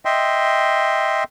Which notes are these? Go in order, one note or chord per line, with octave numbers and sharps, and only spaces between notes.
D#5 E5 G5 C6